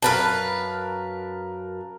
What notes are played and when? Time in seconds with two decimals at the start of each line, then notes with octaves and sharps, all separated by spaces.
0.02 F#2 A#4 B4 F5 A5